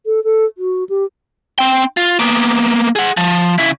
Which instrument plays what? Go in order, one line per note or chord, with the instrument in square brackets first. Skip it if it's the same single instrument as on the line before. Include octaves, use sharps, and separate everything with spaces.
[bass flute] A4
A4
F#4
G4
[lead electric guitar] C4 G5
F4
A#3 B3
G#4 F#5
F3
C#3 E4